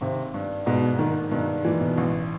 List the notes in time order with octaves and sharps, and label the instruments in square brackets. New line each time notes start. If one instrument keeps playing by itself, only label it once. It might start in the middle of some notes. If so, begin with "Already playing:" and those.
[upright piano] G#1 [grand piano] C3
[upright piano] G2
[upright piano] G#2 [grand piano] B2
[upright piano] D#3
[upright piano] G2 [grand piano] B2
[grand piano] A#2 [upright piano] E3
[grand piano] B2
[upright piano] A1